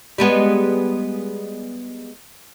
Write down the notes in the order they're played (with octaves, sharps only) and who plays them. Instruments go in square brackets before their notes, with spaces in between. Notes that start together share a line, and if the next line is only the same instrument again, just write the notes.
[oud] G3 G#3 B3